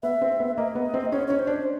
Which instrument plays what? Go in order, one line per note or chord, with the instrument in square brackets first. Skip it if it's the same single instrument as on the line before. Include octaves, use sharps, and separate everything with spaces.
[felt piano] B3 [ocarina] E5
[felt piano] C4
B3
[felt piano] A#3 [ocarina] D#5
[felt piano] B3
C4
[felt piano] C#4 [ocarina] C#5
[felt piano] C#4 [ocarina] C#5
[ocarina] C5
[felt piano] D4